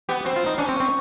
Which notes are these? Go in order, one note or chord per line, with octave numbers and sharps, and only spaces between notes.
B3 G4
C4 F#4
F4
D#4
C#4 D4
C4
C4